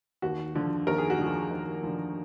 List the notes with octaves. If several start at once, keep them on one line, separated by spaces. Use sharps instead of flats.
D#2 F#4
D3 F3
D#2 A#4
G#4
F#4
D3 F3 G#4
D#2
D3 F3